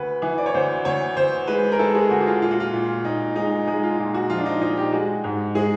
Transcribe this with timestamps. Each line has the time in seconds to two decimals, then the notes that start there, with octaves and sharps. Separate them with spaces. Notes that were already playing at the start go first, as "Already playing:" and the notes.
Already playing: D2 B4
0.22 E3
0.38 D5
0.46 C#5
0.54 D2 C5
0.85 D2 C#5
1.16 D2 C5
1.47 G#3 B4
1.72 A#4
1.79 G#3 A4
1.95 G#4
2.10 D2 F#4
2.21 F#4
2.26 F4
2.41 A#2 F4
2.51 F#4
2.60 F4
2.73 A#2
3.04 A#2 D#4
3.35 G#3 D#4
3.67 G#3 D#4
3.83 F4
3.98 A#2
4.14 F#4
4.30 F3 F4
4.38 D4
4.45 D#4
4.61 A#2 D#4
4.77 G4
4.92 G#3 F#4
5.24 G#2
5.55 G#3 G#4